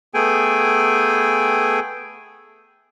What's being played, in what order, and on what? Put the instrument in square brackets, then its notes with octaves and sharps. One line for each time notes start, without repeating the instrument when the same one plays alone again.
[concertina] A3 B3 G#4 A4 G5 G#5